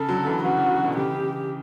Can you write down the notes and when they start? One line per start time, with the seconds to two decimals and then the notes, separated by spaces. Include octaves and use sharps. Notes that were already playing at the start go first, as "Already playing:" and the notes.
Already playing: C#3 A4
0.09 D3 F#3
0.26 C#3 E3
0.44 C#3 E3 F#4
0.57 C#3 E3
0.71 C#3
0.84 B2 D3
0.97 C#3 E3 G4
1.14 C#3